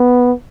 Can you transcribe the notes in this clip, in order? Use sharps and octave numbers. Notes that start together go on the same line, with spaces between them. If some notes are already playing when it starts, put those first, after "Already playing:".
Already playing: B3